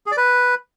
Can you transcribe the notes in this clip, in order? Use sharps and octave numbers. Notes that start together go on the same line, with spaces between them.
G#4
D5
B4